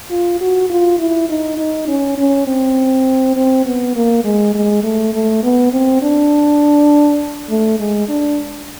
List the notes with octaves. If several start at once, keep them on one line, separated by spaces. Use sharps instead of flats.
F4
F#4
F4
E4
D#4
D#4
C#4
C#4
C4
C4
B3
A#3
G#3
G#3
A3
A3
B3
C4
D4
A3
G#3
D4